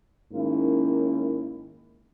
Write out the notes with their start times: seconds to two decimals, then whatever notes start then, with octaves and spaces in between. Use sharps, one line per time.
0.31 G#2 D#3 A#3 C#4 E4